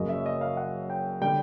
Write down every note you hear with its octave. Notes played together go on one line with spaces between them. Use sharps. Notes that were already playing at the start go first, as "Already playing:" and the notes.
Already playing: F#1 F#2 C#3 D#5
E5
D#5
F5
F#5
G5
D3 G3 G5